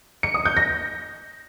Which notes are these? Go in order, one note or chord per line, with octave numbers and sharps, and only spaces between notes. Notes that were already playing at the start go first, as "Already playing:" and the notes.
C#7
D#6
G6
A#6